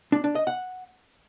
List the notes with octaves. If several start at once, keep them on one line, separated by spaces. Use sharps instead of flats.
D4
D4
D#5
F#5